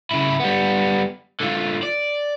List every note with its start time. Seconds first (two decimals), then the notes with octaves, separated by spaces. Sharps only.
0.11 C#3 E4
0.40 G3 B3
1.40 D3 F4
1.83 D5